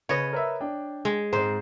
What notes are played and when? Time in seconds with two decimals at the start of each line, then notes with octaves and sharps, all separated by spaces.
0.09 C#3 B4 C#5 D#5 A6
0.33 A#4 B4 E5
0.60 D4 G5
1.05 G#3
1.33 G#2 C4 C5